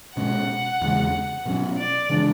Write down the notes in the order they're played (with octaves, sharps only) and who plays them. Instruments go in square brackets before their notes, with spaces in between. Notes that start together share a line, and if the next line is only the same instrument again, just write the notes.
[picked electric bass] B2 G#3 C#4 [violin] F#5
[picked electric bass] E2 C#3 G#3
B2 F#3 C#4
[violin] D5
[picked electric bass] C#3 E3 G#3 D4